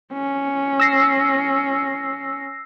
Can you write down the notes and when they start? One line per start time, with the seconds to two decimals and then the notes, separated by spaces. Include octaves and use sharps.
0.13 C#4
0.80 E6 A#6 C7